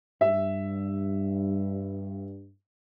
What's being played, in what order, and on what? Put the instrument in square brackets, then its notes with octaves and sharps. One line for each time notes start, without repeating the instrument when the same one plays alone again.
[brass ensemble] G2 [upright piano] E5